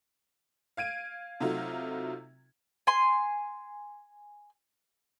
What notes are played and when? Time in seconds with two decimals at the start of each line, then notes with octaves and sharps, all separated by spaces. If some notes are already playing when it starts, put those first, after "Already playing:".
0.77 F5 G#6 D7 D#7
1.40 C3 F#3 A3 D#4 F4
2.87 G#5 C6